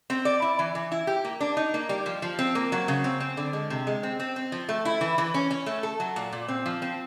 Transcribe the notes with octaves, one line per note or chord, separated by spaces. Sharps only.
C4
D5
E4
E3
E3
E4
G4
A#3
D4
D#4
A#3
G3
F3
F3
C4
A#3
F#3
C#3
C4
C4
D3
G#3
C3
G#3
C4
C4
C4
F3
A3
E4
E3
E3
C#4
C#4
A3
A4
F#3
A#2
A#2
C4
F3
C4